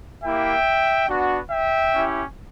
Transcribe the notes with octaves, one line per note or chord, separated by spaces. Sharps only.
A#3 E4 G4 E5 G5
B3 D4 F#4
E5 G5
C#4 E4 G4